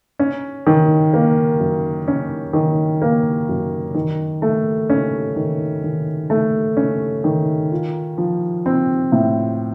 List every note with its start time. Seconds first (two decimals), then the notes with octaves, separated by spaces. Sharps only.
0.19 C#4
0.67 D#3
1.14 A#3
1.60 F#2
2.08 C#4
2.53 D#3
3.02 A#3
3.48 F#2
3.94 D#3
4.42 A3
4.90 C#4
5.36 D#3
5.83 D#3
6.30 A3
6.77 C#4
7.24 D#3
7.72 F4
8.18 F3
8.66 C4
9.12 A2